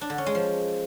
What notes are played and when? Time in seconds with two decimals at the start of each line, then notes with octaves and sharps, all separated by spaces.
0.01 D4
0.10 D3
0.18 C#4
0.26 G#3
0.35 F3